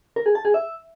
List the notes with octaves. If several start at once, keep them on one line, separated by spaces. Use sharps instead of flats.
A#4
G#4
A5
G#4
E5